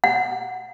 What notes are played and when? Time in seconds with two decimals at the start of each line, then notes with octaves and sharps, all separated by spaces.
0.04 F#5